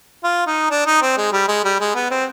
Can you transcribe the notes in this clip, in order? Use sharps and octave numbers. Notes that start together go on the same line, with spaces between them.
F4
D#4
D4
D#4
C4
G#3
G3
G#3
G3
G#3
B3
C4